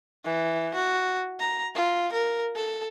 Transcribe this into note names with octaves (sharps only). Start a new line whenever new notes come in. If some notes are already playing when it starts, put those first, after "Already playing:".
E3
F#4
A#5
F4
A#4
A4